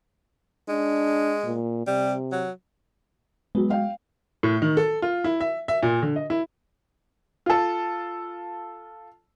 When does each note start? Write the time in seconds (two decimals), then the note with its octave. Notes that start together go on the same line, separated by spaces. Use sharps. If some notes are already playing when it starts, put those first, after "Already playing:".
0.69 G#3 D4
1.44 A#2
1.87 C3 G3
2.32 F#3
3.55 F#3 G#3 B3
3.70 F5 G5
4.43 A2
4.62 D#3
4.77 A4
5.02 F4
5.24 E4
5.40 E5
5.68 E5
5.83 A#2
6.02 D3
6.16 D#5
6.30 E4
7.46 F4 A4